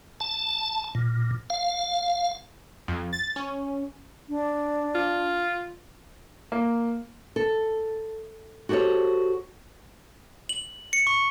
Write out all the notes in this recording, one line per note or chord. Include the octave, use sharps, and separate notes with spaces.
A5
A#2
F5
F2
A6
C#4
D4
F4
A#3
A4
F#4 G4 A4 C5 C#5
F#7
C#7
C#6